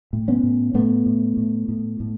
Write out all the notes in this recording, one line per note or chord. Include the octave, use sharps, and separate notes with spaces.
A2
B3 C#4
A2
A2 A3 B3
A2
A2
A2
A2